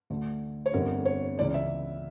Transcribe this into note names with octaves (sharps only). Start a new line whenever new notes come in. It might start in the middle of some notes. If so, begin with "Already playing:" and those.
D2 D3 A3
C#5
G1 F2 D3 G3 A#4
C#5
C#2 C#3 E3 D5
E5